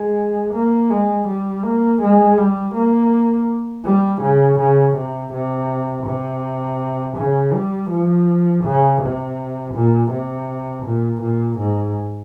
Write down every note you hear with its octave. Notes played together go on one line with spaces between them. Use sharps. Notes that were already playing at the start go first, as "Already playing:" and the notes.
Already playing: G#3
A#3
G#3
G3
A#3
G#3
G3
A#3
G3
C#3
C#3
C3
C3
C3
C#3
G3
F3
C#3
C3
A#2
C3
A#2
A#2
G#2